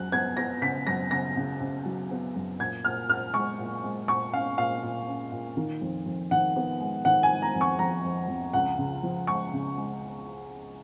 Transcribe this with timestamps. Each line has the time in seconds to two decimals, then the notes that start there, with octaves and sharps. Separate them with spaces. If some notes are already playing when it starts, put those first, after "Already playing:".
Already playing: F#2 F#3 F#6
0.12 B3 G#6
0.37 B3 A#6
0.62 C#3 B6
0.87 F#2 A#6
1.11 C#3 A#6
1.37 C#3
1.61 C#3
1.86 F#3
2.11 B3
2.36 F#2
2.59 A#2 G#6
2.85 A#2 F6
3.09 A#2 F6
3.34 G#3 C#6
3.59 A#2
3.84 G#3
4.08 A#2 C#6
4.33 C#4 F5
4.58 A#2 F5
4.83 A#2
5.08 C#4
5.32 A#2
5.57 D#3
5.81 F2
6.06 F2
6.31 D#3 F#5
6.56 B3
6.80 G#3
7.05 D#3 F#5
7.23 G#5
7.30 G#3
7.42 A#5
7.55 F2
7.61 C#6
7.79 F2 A#5
8.05 F2
8.28 F2
8.53 C#2 F#5
8.78 C#3
9.03 F3
9.27 G#3 C#6
9.53 C#3
9.77 G#3